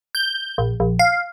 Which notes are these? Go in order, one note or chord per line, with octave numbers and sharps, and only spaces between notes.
G6
A#1
A#1
F5